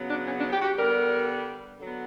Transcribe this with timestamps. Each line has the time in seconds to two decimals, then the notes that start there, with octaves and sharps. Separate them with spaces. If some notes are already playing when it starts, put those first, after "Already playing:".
Already playing: C#3 F#3 B3
0.09 D4
0.25 C#4
0.39 D4
0.51 G4
0.61 F#4
0.64 G4
0.77 D3 G3 B3 A#4
1.79 D3 F#3 B3